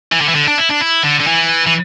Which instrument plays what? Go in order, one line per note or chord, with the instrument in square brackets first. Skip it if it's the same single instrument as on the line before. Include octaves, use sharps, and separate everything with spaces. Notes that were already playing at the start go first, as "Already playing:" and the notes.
[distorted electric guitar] E3
D3
E3
D3
D4
E4
D4
E4
D3
D3
E3
E3